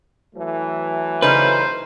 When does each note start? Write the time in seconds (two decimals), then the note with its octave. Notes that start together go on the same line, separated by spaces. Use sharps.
0.36 E3 F#3 A3
1.22 C#3 C#4 D#4 B4 C5